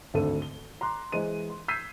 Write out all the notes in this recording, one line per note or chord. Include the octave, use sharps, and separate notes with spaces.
G#1 D2 A4 D#7
G7
A#5 C6 D6 F#6
E3 G#3 C5 D#7
C6
E6 G6 G#6 B6 C7 D#7